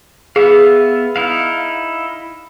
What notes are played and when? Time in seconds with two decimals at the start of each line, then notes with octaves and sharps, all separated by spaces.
0.36 B3 G#4 E5 F5
1.16 D#4 E4 F5